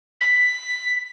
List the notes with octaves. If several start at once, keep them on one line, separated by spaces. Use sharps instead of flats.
B6